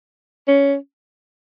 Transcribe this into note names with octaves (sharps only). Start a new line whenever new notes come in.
C#4